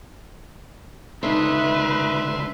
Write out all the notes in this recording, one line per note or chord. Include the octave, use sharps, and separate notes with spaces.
C#2 D3 A3 D#4 B4 E5 C6